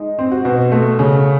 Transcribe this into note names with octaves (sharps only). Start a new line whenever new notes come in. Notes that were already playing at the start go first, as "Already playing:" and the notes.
Already playing: G#3 D#4
C4
F#4
B2
A3
C#3